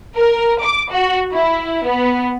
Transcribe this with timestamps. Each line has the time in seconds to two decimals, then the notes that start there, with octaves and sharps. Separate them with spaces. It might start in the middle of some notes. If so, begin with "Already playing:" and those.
0.16 A#4
0.61 D6
0.91 F#4
1.32 E4
1.85 B3